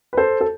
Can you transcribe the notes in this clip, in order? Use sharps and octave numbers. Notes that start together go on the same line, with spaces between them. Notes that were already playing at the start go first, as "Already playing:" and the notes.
B4
A4 C5
A4